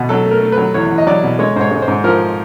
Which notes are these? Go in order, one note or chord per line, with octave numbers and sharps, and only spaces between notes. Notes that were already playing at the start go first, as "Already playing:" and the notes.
Already playing: B2
F#3 A4
A3
A#4
A3
B4
F#3
E2 C#5
E2
D#5
F#3 D5
B2
G#3 C#5
G#2 C5 C#5
G#3
C5
G#2
F3 A#4